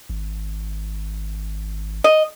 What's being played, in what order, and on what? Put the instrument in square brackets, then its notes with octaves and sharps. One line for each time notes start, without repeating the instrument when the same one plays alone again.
[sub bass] G#1
[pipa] D#5